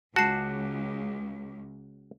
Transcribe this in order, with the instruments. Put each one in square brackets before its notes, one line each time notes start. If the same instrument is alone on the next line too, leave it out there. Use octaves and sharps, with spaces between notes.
[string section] C#2 [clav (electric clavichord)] F#4 [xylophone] A5 C7